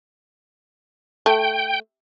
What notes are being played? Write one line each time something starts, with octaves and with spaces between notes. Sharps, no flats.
A3 G5